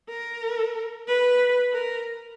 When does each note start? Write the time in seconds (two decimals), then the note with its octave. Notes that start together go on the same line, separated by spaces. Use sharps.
0.09 A#4
1.08 B4
1.74 A#4